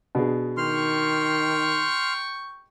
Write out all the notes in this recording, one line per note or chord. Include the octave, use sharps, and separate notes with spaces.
B2 D4 G#4
D#3 G5 C6 C#6 F6